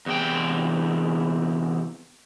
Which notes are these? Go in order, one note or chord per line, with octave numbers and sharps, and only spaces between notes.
E2 C3 G5